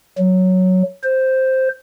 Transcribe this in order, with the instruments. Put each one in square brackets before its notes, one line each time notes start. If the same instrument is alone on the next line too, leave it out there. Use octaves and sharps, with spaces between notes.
[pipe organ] F#3
C5